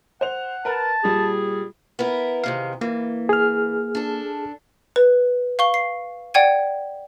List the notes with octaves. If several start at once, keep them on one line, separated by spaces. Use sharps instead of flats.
C5 F#5 F7
A#4 B4 A5
A#2 G3 G#4
B3 E4 A#4
E2 C3 D#3 F5
E3 A#3
G#4 F6
D4 A4
B4
F5 C#6 G7
C7
D5 F#5 G5 G#6 D#7